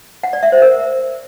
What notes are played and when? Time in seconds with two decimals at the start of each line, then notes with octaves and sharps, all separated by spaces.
0.23 F#5
0.33 D5
0.43 E5
0.52 C5
0.62 A#4